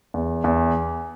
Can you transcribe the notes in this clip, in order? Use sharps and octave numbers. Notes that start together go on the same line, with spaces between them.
E2
E2